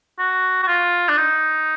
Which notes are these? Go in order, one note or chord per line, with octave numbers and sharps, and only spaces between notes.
F#4
F#4
F4
D4
D#4